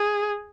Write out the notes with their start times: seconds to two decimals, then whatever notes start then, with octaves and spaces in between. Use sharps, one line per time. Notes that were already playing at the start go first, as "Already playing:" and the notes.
Already playing: G#4